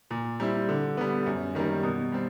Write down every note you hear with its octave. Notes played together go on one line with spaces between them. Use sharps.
A#2
G3 C4 E4
D3
G3 B3
F#2
D#3 G3 A#3
B2
G3 C4